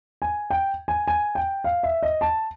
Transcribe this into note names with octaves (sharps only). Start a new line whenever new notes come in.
G#5
G5
G#5
G#5
G5
F5
E5
D#5
A5